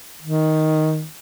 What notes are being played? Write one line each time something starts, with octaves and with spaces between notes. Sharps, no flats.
D#3